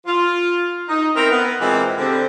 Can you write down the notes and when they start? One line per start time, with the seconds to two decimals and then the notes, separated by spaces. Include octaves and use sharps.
0.06 F4
0.89 D#4
1.15 B3 C4 D#4 E4 A#4
1.30 B3
1.60 A#2 E3 G#3 A#3 C4 E4
1.98 D3 G3 C4